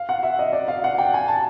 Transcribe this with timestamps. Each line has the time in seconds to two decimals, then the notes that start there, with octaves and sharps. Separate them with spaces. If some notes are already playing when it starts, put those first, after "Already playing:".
Already playing: F5
0.09 F#5
0.23 E5
0.39 D#5
0.53 D5
0.68 F5
0.84 F#5
0.98 G5
1.14 G#5
1.28 A5